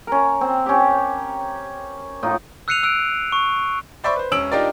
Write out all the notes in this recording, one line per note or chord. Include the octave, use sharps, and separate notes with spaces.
C#4 A#4
C4
C#4 G4
A2 D#4 F4
E6 F#6 C7 C#7 D#7 F7
E6 F#6 D7
C#6
C5 D5 E5 B5 C#6
B4 C5
E1 C#4 E6 D7 F#7
D4 D#4 F4 G4 A#4 D5